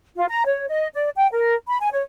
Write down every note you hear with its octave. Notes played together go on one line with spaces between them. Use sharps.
F4
A#5
C#5
D#5
D5
G5
A#4
B5
G#5
C#5